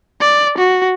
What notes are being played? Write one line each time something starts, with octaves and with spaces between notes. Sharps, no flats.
D5
F#4